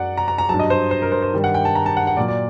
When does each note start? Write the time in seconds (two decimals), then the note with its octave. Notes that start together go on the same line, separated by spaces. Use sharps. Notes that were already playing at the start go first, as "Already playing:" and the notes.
Already playing: F#2 F#3 D5 F#5
0.17 A#5
0.28 A#5
0.38 A#5
0.49 G2 F#3 A5
0.59 D#5
0.70 C5
0.91 C5
1.02 A#4
1.12 C5
1.22 C5
1.33 G2 D#3 G3
1.44 F#5
1.54 G5
1.65 A5
1.75 A#5
1.86 A5
1.97 F#5
2.07 F#5
2.17 A#2 F#3 D5
2.28 D5